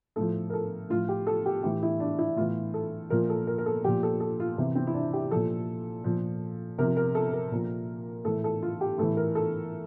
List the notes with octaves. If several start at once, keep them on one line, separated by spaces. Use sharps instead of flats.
A2 F3 A4
A#4
A4
A2 F3 F4
G4
A4
G4
A2 E3 G4
E4
D4
E4
A2 E3 F4
A4
A#2 F3 A#4
A4
A#4
A#4
A4
A#2 F3 G4
A4
A4
F4
C3 E3
C4
E4
D4
G4
A#2 F3 A4
A#2 F3
C3 F3 A#4
A#4
A4
A#4
A#2 F3
A2 E3 A4
A4
F4
G4
A2 E3 A4
A#4
A4